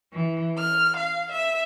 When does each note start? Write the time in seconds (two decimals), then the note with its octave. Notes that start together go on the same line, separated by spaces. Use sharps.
0.13 E3
0.58 F6
0.96 F5
1.31 E5